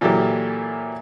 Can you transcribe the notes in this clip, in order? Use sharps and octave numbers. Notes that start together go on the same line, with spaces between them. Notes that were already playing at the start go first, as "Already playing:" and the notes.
A#2 E3 F#3 A#3 G4 A4